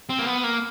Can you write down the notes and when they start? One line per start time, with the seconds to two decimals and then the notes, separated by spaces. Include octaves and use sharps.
0.09 C4
0.19 A#3
0.26 B3
0.44 A#3